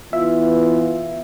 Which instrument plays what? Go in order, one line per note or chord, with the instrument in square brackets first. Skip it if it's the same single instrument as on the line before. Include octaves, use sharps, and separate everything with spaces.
[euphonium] E3 [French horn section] B3 [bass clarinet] F4 [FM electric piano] E5